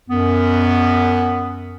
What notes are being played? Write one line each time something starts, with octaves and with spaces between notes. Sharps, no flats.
F#2 B3